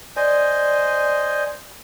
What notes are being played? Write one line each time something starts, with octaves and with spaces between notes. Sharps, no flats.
C5 D5 D#5 G#5